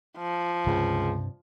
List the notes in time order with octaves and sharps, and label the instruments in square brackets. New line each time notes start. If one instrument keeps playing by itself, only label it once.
[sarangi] F3
[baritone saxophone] C#2 [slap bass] G2 C3